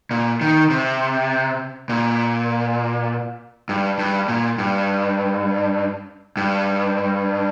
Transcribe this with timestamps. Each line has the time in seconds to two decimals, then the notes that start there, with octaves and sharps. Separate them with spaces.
0.11 A#2
0.41 D#3
0.70 C3
1.89 A#2
3.69 G2
3.99 G2
4.28 A#2
4.58 G2
6.37 G2